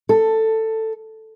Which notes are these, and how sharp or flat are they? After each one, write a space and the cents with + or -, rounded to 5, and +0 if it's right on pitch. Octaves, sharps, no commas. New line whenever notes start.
A4 +10